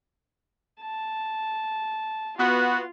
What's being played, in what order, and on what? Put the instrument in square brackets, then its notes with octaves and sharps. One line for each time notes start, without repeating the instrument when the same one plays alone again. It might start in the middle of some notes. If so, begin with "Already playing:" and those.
[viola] A5
[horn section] B3 F#4 [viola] F4